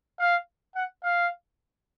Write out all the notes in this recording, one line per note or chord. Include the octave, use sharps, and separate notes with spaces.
F5
F#5
F5